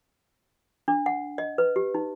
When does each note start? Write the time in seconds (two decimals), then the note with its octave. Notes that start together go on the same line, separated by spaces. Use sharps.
0.88 D4
1.06 F#5
1.38 D#5
1.58 B4
1.76 G4
1.94 D#4